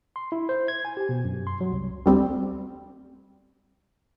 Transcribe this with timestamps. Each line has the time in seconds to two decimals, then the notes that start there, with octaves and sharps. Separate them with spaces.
0.16 C6
0.32 E4
0.49 C5
0.68 G#6
0.85 G#5
0.97 G4
1.09 B2
1.25 F#2
1.47 C6
1.61 F#3
1.72 C2
2.06 D2 G3 C4